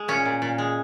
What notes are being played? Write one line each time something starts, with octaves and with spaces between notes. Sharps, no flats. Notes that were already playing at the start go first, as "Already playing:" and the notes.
Already playing: G#3
A#2 C#4
A#2
A#2
G#3